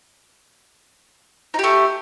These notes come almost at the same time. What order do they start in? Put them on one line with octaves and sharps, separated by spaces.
D#4 G4 A3